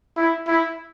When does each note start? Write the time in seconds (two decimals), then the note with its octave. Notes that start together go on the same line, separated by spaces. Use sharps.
0.17 E4
0.47 E4